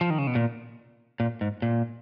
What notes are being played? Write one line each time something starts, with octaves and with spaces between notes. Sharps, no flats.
F3
D#3
C#3
B2
A#2
A#2
G#2
A#2